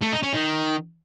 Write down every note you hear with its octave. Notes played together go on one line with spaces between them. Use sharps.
A3
D#4
C#4
D#3